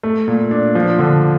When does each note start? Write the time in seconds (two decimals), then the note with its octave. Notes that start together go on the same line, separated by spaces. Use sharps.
0.03 A3
0.28 A#2
0.51 D4
0.75 F3
0.99 D3